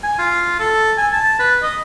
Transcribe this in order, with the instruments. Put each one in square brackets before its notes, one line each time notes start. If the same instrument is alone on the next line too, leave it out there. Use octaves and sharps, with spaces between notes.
[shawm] G#5
F4
A4
G#5
A5
B4
D#5